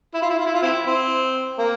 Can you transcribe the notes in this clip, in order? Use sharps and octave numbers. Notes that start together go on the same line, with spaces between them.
E4
F4
E4
F4
E4
F4
C4 E4
C4
A#3